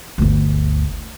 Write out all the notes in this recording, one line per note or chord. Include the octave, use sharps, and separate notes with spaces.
G1 D2